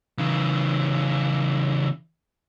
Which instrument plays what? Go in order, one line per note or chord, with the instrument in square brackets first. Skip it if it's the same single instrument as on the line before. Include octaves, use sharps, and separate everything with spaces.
[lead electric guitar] C#3 E3